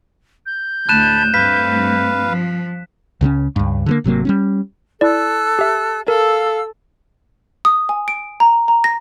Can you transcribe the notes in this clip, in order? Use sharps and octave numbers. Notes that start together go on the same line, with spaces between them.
G6
D2 A2 A3 A5 B5 F#6 D#7 E7
G2 A3 C4 B4 F5 B6
F3
C#2 C#3 G3 C#4
C#2 G2
D3 F#3 A#3
G#1 C3 F#3 A#3
G3 B3 C#4
E4 A4 D5 E6 F#6
G4 E5
A4 A#4 F5 E6
D#6
G#5
D7
A#5
A#5
A#6